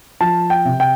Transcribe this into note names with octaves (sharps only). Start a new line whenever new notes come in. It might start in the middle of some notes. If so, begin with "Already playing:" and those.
F3 A5
G5
C3
G5